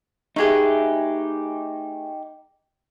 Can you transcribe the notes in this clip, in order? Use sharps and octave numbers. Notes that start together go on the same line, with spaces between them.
A3 D#4 G4 G#4 B4